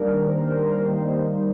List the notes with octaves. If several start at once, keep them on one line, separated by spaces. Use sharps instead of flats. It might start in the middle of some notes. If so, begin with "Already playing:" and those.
Already playing: D#3 G3 A#3 D4 A#4
C5
A#4
C5
D#3 G3 A#3 D#4